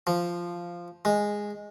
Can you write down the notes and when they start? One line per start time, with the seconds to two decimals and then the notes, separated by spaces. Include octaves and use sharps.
0.07 F3
1.05 G#3